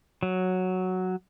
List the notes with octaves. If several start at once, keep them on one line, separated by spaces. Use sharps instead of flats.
F#3